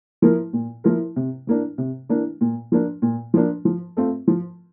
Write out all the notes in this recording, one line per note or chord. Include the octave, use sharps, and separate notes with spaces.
F3 A#3 E4 A#4
A#2
F3 A#3 E4 A#4
C3
E3 A#3 D4
C3
E3 A#3 D4
A#2
F3 A#3 D4
A#2
F3 A#3 D4
F3
A3 C4 F4
F3